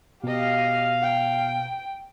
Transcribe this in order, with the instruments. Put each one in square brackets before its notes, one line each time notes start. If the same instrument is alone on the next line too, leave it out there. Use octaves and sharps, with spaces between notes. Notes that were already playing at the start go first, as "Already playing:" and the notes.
[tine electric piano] B2 [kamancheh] G4 D#5 [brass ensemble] F5
[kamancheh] G5